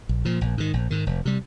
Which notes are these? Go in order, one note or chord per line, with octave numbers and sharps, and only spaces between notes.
A#1
A#2 F3
A#1
G#2 D#3
A#1
G#2 D#3
F1
C3 G3